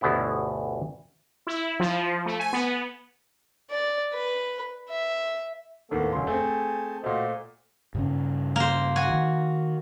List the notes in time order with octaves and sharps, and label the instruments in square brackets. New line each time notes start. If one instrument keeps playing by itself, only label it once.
[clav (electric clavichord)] G1 D2 B2 B3 E4
[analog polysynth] E4
F3
A3
G#5
B3
[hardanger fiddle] D5
B4
E5
[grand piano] D#2 A2 [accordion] A#3 B3 A4
[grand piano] F1 C6 [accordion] F#3 C#4
[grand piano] A3 C4 [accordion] G#4 G#5 A5
[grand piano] A#2 A3 [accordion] F#4 C5 D#5
[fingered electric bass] G2 C#3 C#4
[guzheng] A#3 C5
F#4 G#5
[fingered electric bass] D#3